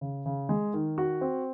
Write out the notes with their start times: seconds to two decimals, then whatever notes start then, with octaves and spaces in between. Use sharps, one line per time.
0.01 C#3
0.26 C#3
0.49 G#3
0.74 D#3
0.98 F#4
1.21 C4